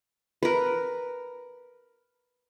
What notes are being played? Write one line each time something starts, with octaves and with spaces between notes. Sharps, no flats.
A#4 B4